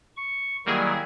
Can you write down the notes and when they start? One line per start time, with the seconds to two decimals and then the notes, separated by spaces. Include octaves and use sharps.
0.17 C#6
0.66 D#3 F#3 G3 A#3 E4 G#4